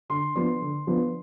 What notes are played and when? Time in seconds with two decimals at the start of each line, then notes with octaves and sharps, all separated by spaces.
0.09 D3 C6
0.35 F3 B3 D4 C6
0.62 D3
0.87 F3 B3 D4